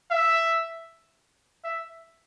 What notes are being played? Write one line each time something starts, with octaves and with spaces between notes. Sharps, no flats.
E5
E5